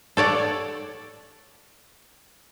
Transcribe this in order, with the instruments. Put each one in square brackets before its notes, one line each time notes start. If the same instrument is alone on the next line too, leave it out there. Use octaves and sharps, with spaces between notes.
[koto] A4 C#5 D5 F#5